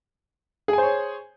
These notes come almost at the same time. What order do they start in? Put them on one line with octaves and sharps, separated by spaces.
G#4 G#5 C5 C#5